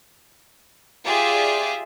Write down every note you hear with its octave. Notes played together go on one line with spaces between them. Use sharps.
F4 G4 G#4 D5 E5